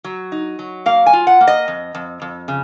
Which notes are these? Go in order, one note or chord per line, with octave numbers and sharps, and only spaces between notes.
F#3
D#4
F#3
A#3 F5
G#5
F4
F#5
A#3
D#5
F2
F2
F2
C#3